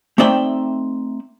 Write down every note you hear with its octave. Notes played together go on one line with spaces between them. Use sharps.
A3 C4 D#4 D5 E5 G5